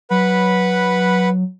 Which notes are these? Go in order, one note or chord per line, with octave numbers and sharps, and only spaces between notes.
F#3 B4 F#5 B5